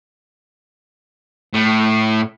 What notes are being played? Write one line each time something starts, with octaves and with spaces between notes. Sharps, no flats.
A2